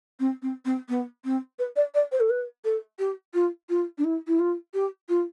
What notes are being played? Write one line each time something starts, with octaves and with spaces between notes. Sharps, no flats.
C4
C4
C4
B3
C4
B4
D5
D5
C5
A4
B4
A4
G4
F4
F4
D4
E4
E4
F4
G4
F4